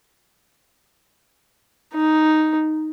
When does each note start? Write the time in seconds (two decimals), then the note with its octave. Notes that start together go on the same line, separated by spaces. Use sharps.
1.94 D#4